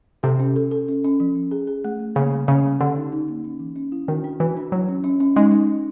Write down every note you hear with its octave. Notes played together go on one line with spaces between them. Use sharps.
C3 A4
C#4
A4
A4
C#4
C#4
F3
C#4
G#4
G#4
A3
A3
C#3 A#3
G3
C#3 C#4
G3
D3 G4
D#4
D#4
A#3
C#4
E3
C#4
E4
D#3 F#4
D4
E3 F#4
D4
F#3 E4
C#4
C#4
C#4
G#3 D#4
D#4
D#4